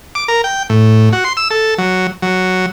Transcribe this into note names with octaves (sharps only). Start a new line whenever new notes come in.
D6
A#4
G5
A2
F#4
C6
E6
A4
F#3
F#3